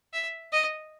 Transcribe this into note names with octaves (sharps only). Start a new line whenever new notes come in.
E5
D#5